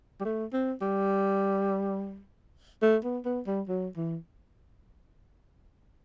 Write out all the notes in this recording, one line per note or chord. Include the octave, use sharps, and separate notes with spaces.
G3
A3
C4
G3
A3
B3
B3
G3
F#3
E3